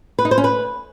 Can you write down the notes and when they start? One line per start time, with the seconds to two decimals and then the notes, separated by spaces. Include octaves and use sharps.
0.19 B4
0.25 D#4
0.31 C5
0.38 C#4
0.44 B4